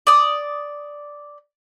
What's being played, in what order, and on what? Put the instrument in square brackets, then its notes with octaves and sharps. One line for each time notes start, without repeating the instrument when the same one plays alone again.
[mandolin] D5 D#6